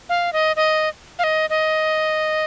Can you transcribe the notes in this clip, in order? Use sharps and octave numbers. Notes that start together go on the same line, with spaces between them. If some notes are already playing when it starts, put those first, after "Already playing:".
F5
D#5
D#5
F5
D#5
D#5